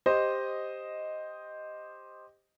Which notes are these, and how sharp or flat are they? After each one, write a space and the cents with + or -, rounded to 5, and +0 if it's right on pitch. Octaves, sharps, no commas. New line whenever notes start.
G4 +5 C5 +0 D#5 +0